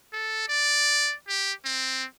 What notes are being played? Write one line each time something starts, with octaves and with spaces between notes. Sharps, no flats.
A4
D5
G4
C4